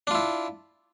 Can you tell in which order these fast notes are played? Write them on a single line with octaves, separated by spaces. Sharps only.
D4 F4 E4